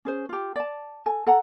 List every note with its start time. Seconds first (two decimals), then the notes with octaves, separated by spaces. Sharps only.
0.05 C#4 G#4 C5
0.29 F4 G4
0.56 D5 A5
1.06 A4 G#5
1.27 A4 F#5 A#5